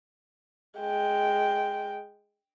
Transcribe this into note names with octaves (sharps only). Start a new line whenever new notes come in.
G#3 G5